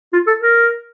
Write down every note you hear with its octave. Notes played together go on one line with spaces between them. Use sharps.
F4
A4
A#4